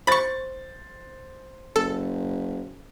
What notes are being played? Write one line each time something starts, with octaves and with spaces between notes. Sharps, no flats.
C5 B5 C#6 A6
F#1 A4